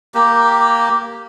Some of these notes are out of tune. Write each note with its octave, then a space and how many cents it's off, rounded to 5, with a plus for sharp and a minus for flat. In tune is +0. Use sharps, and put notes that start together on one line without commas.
A#3 +0 G4 +0